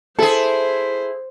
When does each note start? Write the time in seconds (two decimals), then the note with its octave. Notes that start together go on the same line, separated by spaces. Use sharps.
0.19 E4 G#4 A4 C5